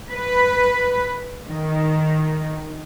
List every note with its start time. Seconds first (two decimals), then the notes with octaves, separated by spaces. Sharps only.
0.12 B4
1.48 D#3